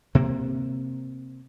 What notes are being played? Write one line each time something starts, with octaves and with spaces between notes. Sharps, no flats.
C3 A#3